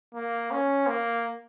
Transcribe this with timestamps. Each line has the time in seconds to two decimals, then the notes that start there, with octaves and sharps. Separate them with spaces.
0.14 A#3
0.51 C#4
0.87 A#3